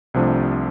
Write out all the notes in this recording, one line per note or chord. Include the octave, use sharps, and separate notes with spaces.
C2 C3 F3 A3 D4